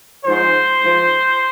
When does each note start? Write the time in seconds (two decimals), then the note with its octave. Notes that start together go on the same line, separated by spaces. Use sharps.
0.25 G#2 F3 C5
0.81 G#2 F3